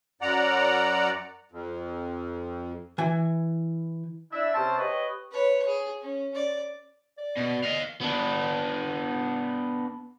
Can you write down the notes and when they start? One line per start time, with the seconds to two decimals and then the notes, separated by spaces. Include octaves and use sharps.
0.21 F#2 D5 F#5 A#5
1.52 F2
2.98 E3 G#5
4.32 D4 E4 E5
4.54 C3 C4 C#4 C5 A5
4.79 G4 B4 C#5 D#5
5.31 B4 C#5
5.68 G#4
6.02 C#4
6.35 D5
7.18 D5
7.37 B2
7.64 D#5 F5
8.01 B3 D4